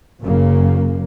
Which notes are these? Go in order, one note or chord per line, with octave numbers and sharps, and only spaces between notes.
F#1 F#2 C#3 F#3 A#3